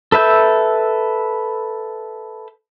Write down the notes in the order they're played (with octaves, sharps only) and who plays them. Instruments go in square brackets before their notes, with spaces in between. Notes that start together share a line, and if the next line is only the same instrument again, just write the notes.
[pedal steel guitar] A4 B4 E5 G6